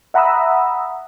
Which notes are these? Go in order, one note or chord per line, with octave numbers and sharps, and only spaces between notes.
E5 F#5 A#5 B5 D#6 E6